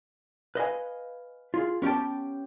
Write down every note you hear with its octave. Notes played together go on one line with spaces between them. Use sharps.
B4 D#5 F5 G#5
F4 G#4
B3 C#4 G4 G5 A5